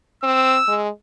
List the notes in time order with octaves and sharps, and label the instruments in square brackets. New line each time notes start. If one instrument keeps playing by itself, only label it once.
[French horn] C4 [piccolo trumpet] E6
[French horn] G#3